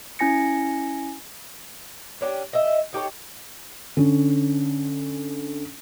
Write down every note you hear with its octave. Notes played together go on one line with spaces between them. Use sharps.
C#4 E4 G#5 A#6 C#7
C#4 D4 F#4 G4
D#5 E5
D#4 G4 A4 C#5
D3 C#4